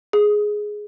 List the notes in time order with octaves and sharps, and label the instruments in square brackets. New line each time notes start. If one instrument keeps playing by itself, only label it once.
[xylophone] G#4